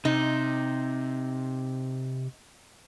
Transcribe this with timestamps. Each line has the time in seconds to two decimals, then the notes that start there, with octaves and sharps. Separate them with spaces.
0.05 C3 D#4